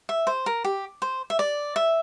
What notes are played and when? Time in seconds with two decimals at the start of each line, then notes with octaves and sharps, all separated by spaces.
0.09 E5
0.27 C5
0.46 A#4
0.64 G4
1.02 C5
1.30 E5
1.39 D5
1.76 E5